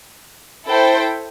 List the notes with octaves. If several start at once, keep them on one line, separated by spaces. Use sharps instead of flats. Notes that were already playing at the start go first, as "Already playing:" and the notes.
E4 A4 C5 G5